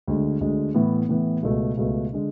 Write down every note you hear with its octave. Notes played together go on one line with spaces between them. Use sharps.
D2 D3 G#3
D2 D3 G#3
A2 E3 B3
A2 E3 B3
C#2 B2 A3
C#2 B2 A3
D3 G#3